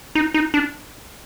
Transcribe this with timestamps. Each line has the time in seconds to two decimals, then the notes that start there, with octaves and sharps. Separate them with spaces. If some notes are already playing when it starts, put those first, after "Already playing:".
0.15 D#4
0.34 D#4
0.54 D4